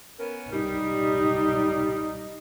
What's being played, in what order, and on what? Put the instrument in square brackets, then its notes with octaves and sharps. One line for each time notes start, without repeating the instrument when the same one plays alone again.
[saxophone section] B3 C#4 A#4
[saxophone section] G3 [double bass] D#4